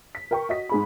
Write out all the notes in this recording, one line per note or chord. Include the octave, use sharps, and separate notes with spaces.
B6
A#4 G5 C#6
F#4 D#5 B6
G#2 G#4 B5